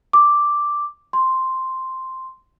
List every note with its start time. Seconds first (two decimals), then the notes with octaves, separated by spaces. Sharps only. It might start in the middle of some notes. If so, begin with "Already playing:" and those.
0.13 D6
1.13 C6